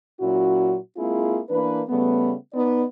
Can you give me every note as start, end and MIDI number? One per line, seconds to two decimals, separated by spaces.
0.20 0.77 46
0.20 0.77 54
0.20 0.77 61
0.20 0.77 64
0.20 0.77 66
0.97 1.40 56
0.97 1.40 58
0.97 1.40 60
0.97 1.40 64
0.97 1.40 65
0.97 1.40 68
1.50 1.80 52
1.50 1.80 58
1.50 1.80 62
1.50 1.80 71
1.88 2.33 49
1.88 2.33 55
1.88 2.33 57
1.88 2.33 59
2.53 2.82 59
2.53 2.82 63
2.53 2.82 74